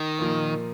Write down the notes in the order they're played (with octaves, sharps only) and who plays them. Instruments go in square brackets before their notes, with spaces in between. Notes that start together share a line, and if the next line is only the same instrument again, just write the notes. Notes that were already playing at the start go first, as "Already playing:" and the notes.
Already playing: [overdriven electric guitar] D#3
[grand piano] A#2 F3 A#3